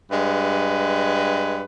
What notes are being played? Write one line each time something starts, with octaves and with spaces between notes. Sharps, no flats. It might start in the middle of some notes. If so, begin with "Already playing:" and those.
G2 G#3 B4